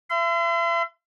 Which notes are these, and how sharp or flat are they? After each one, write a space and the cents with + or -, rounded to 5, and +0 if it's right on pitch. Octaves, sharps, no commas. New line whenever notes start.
E5 +40 C6 -40